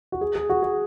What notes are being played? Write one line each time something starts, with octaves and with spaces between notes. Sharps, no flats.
F#4
G#4
G#4
F#4
G#4